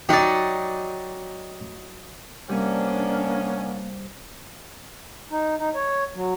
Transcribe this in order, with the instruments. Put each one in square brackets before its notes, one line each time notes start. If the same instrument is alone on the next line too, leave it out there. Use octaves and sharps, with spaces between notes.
[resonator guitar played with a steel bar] F#3 D#4 [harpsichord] G4 D5
[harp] C3 G3 [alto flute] A#3 [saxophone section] B3 C#4 [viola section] D4
[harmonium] D#4
D#4
C#5
F#3